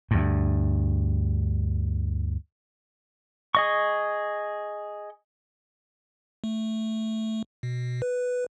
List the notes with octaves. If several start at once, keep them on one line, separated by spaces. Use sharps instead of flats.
D2 G2
G#4 D#5 C#6
A3
B2
B4